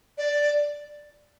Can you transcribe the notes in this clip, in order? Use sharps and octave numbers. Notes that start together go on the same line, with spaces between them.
D5